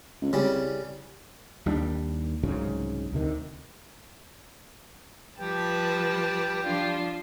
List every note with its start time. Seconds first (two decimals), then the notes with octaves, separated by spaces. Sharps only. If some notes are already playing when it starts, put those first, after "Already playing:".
0.22 C#2
0.33 C2 C#3 G3
1.66 D#2 G3 D4
2.43 C2 G#2 C#3 F#3
3.13 D2 C3 D#3
5.39 F3 G3 B4 G5 A5
6.62 F3 D4 F4